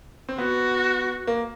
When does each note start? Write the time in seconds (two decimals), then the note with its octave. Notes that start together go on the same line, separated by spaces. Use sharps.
0.29 C4
0.38 B3 F#4
1.27 A#3